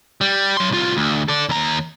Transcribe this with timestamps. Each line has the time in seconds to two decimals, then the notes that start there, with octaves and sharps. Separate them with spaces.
0.21 G3
0.57 F#3 C6
0.71 C2 F4
0.97 D2
1.28 A4 D5
1.49 D#2 A#5